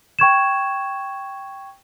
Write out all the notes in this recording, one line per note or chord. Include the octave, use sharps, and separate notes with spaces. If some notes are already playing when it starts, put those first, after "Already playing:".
G5 C#6 G#6 E7